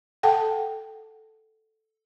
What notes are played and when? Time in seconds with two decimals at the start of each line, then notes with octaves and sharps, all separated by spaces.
0.23 A4 F#5 G5 A5